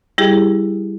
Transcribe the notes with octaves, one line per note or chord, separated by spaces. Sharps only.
G3 E4 G4 G#4